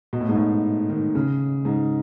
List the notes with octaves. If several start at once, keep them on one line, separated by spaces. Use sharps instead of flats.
B2
A2
G#2
A2
D#3
C#3
G#2